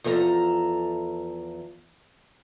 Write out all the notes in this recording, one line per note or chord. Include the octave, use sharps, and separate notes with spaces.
E2 F3 A4 D5 A#5